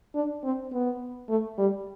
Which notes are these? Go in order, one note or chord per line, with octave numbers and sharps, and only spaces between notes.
D4
C4
B3
A3
G3